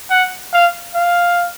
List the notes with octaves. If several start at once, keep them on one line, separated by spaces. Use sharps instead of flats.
F#5
F5
F5